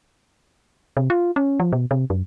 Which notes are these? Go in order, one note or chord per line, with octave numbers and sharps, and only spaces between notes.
C3
F4
C#4
F3
B2
C3
F#2